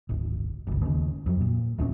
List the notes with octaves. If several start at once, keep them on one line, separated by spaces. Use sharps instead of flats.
D1 G#1
G1 C#2
D#2 C#3
F2 F#3
A#2
D#1 E2 C4 C#4